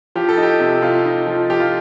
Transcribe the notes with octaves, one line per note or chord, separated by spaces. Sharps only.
F3 G4
A4
D#4
G4
C3
C3 F4
D#4
F3
F3 G4
F4